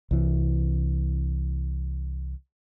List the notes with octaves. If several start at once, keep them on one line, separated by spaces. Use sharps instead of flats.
C2 E3